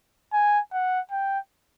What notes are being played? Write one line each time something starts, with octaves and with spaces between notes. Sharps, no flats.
G#5
F#5
G5